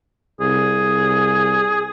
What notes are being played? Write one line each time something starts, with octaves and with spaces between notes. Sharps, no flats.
C2 G#4